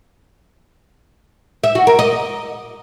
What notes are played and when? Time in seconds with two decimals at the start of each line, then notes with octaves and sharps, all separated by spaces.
1.64 E5
1.75 F#4
1.87 A#4
1.99 D#5